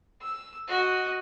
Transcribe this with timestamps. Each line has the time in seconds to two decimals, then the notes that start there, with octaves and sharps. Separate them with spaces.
0.21 E6
0.68 F#4 D#5